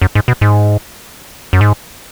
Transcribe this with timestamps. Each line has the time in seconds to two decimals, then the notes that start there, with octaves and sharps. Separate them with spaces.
0.02 F#2
0.15 G#2
0.28 B2
0.41 G#2
1.53 F#2
1.61 G#2